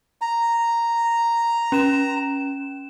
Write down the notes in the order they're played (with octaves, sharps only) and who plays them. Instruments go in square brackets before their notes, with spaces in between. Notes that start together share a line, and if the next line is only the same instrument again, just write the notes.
[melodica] A#5
[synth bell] C#4 E7